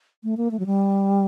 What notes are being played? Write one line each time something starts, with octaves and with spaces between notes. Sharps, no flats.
A3
A#3
A3
F#3
G3